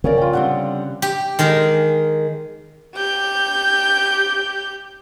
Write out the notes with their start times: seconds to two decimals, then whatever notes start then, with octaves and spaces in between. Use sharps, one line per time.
0.04 C#3 C#4 A#4 D5
0.17 F4 G5
0.33 D3 G3 C4 F#5
1.02 G4
1.39 D#3 G#3 A#4
2.96 G4 G6